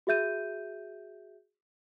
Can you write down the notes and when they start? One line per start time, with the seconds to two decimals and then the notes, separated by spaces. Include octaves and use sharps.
0.07 F#4 G#4 E5 G6 D#7